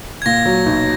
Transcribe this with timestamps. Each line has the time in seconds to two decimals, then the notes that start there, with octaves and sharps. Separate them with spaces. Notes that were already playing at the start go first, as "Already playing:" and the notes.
0.22 G#6
0.26 A#2 A#6
0.46 F#3
0.66 B1